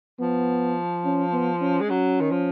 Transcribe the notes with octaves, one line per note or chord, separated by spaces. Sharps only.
F3 B3
C#4
B3
C#4
G#3
F#3 C#4
D#3
F3